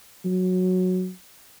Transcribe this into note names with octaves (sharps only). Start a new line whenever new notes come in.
F#3